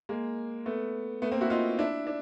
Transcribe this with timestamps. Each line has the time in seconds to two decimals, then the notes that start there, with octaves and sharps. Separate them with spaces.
0.09 G#3 A#3
0.66 A3 B3
1.22 A3 B3
1.31 A#3 C4
1.41 E4 F#4
1.50 D#4 F4
1.79 D4 E4
2.07 D4